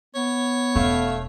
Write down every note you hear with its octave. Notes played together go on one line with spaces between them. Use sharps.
B3 C#5
E1 A3 F5